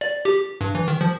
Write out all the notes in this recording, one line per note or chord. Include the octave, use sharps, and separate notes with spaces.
D5
G4
G2
E3
D#3
F3